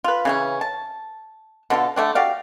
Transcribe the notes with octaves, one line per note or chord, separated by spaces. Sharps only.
F4 B4
C#3 E3 C#4
A5
B2 D3 F4 A4
D3 A3 C4 D4
F#4 G4 D5 F5